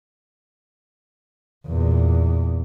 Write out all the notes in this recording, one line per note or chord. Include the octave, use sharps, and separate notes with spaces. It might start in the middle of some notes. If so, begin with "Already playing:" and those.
E2 A#2